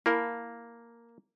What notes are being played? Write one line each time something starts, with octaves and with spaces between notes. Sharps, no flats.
A#3 E4 A#4 F5 A5 B5